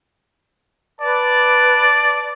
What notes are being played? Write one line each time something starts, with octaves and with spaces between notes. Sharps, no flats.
B4 D5 A5